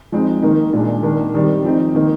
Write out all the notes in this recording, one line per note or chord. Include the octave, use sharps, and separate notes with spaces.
F3 G#3 C4 D#4
D#3 A#3 D#4
A#2 G#3 D4
D#3 A#3 D4
D#3 G3 C4
F3 C4 D#4
D#3 A#3 D#4